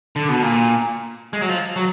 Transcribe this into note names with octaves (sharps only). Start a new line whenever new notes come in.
D3
B2
A#2
G#3
F#3
F3
F#3